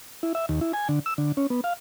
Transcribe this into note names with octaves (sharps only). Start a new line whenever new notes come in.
E4
E5
D#2
E4
G#5
D3
E6
D3
C#4
B3
F5